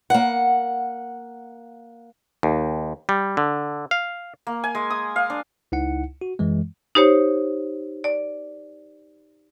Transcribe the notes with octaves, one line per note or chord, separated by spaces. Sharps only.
A#3 F#5
D#2
G3
D3
F5
A#3
G#5
G#3
D#6
F5
D4
C#2 D#4 E4 F#5 C#7
F#4
F#2 E3 G#3
D#4 G4 C5 C#5
D5